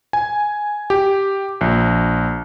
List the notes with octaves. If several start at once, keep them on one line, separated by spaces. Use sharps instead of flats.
G#5
G4
A#1